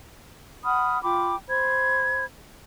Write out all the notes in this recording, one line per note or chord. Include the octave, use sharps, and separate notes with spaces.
F#5 B5 D#6 F6
F4 G5 B5 D6
C5 B5 G#6